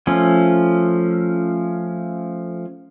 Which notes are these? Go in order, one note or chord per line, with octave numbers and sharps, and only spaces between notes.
F3 A3 C#4